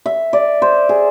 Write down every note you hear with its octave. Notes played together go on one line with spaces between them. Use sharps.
E5
D5
C5
G#4